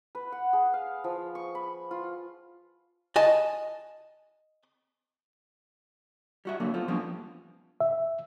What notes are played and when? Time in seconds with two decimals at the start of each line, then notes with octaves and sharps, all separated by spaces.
0.15 B4
0.32 F#5
0.53 G#4
0.73 F5
1.04 F3
1.35 C#6
1.55 B5
1.91 F4
3.16 D#5 G#5 A5
6.45 G3 F#4 E5
6.60 D3 F#3 A3 A#3
6.74 B3 F4 A4 C5
6.88 F3 G3 A#3 B3 C#4 D4
7.81 E5